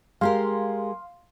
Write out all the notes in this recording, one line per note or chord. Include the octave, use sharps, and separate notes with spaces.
G#3 G4 A#4 F5 C6